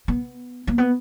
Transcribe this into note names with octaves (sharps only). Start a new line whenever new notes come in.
B3
A#3
B3